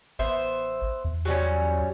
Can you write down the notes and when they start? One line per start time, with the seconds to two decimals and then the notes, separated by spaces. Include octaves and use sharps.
0.19 A1 B3 C5 E5
1.05 E2
1.25 F#3 G3 C#4